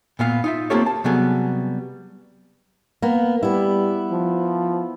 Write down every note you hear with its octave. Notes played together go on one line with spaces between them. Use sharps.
A#2 B3 F5
D#4 F4 E5
A#3 C4 F4 G4 A4 C#5
A5
C3 F#3 G3 B3 G#4 A4
A#3 B3
G3 B3 E4
F3